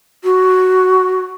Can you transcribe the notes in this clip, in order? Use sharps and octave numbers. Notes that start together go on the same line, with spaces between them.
F#4